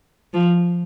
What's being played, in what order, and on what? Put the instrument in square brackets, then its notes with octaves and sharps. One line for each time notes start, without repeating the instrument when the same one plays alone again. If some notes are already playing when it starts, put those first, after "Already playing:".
[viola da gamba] F3